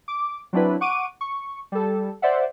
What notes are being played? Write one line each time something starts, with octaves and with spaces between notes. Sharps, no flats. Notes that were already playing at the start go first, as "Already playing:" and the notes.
D6
F#3 C4 D4 E4 B4
F#5 C#6 D6 D7 D#7
C#6
G3 A4
C5 D5 E5 F#5